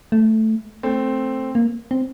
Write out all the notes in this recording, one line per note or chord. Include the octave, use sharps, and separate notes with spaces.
A3
A3 C4
A#3
C4